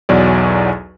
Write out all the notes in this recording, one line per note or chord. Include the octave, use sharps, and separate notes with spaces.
B1 E2 F#3 D5